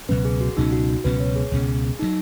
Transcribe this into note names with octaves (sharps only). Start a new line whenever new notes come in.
C#2 B2 F#3 C#4 B4
G#4
F#4
C#2 B2 F#3 C#4 D#4
F#4
C#2 B2 F#3 C#4 B4
C#5
G#4
C#2 B2 F#3 C#4
D#3 F#3 D#4